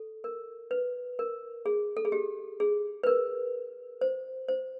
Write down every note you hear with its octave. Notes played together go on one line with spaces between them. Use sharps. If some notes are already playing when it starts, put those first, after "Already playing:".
Already playing: A4
A#4
B4
A#4
G#4
A4
G#4
G4
G#4
B4
A#4
C5
C5